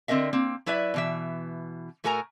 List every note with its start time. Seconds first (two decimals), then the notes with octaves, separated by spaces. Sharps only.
0.08 D3 C4 A#4 D#5 E5
0.33 A#3 C4
0.66 F#3 E4 B4 D5 E5
0.94 B2 E3 E5
2.04 A2 A3 F#4 A#4 G#5 A#5